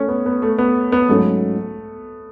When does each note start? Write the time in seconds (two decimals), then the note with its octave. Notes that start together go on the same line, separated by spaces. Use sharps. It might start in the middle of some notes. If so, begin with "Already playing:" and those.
Already playing: A3 C#4
0.08 B3
0.26 B3
0.42 A3
0.58 B3
0.92 B3
1.08 G#2 F#3 A3 C#4